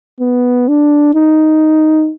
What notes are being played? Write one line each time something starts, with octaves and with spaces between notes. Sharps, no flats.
B3
D4
D#4